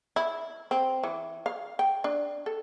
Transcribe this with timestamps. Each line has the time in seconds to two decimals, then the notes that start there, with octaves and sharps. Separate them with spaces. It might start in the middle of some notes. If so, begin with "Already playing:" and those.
0.16 E4
0.71 C4
1.04 E3
1.46 F5
1.79 G5
2.04 D4
2.46 A4